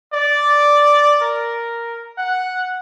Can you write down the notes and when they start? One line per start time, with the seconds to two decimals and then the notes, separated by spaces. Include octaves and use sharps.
0.13 D5
1.22 A#4
2.18 F#5